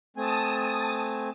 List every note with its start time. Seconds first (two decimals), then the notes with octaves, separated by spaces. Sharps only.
0.17 A3 C4 G#5 A5 D#6